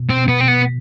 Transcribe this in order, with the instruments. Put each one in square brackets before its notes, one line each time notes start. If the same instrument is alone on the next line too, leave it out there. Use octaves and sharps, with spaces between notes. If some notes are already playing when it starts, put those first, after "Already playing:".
Already playing: [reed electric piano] B2
[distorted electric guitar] C4
[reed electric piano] B2
[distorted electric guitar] B3
[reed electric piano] B2 [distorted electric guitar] C4
[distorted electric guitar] B3